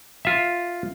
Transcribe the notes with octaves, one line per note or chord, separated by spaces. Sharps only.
F4 E5